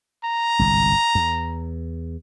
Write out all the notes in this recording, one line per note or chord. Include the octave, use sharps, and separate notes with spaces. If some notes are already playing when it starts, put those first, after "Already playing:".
A#5
G1 C2 G#2
E2